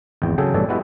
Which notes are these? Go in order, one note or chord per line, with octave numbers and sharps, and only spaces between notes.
G#1 E2 G5
C#3 F#3 G#4 A4 G5
A1 G2 B2 A4 C#5 D5
G#3 B3 E4 F#4 G4 E5